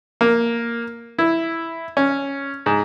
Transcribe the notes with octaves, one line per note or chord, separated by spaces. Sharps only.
A#3
E4
C#4
G#2